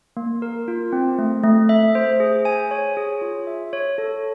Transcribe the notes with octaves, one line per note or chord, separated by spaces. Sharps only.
A#3
A#4
F4
C4
A3
A3
E5
C5
G#4
G#5
C#5
G#4
F4
E5
C#5
A4